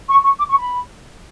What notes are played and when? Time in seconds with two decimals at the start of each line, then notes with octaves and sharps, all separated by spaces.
0.09 C#6
0.23 C#6
0.38 D6
0.49 C#6
0.57 B5